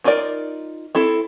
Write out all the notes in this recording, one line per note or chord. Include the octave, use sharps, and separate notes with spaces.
D4 D#4 F4 A#4 D5
C4 E4 A4